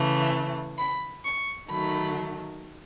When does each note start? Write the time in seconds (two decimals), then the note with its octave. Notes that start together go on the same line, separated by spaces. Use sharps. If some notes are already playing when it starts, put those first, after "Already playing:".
Already playing: C#3 E3 A3
0.78 B5
1.24 C#6
1.69 D#3 F#3 A3 B5